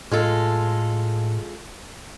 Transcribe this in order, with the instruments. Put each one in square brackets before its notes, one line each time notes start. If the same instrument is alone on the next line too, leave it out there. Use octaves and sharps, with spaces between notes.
[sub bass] A2 [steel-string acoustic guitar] G#3 F4 A4